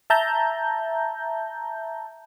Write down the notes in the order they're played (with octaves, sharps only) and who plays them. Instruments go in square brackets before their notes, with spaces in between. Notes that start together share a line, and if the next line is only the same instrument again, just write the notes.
[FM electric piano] E5 A5 A#5 G6